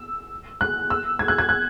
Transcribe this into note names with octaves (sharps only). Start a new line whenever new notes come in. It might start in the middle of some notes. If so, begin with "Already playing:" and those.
Already playing: E6
F#6
E6
G#6
F#6
G#6
F#6